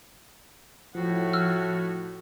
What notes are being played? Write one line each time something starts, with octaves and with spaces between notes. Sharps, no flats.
A2 F3 F#4
E6 F6